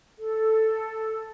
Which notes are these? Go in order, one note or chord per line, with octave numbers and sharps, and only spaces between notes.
A4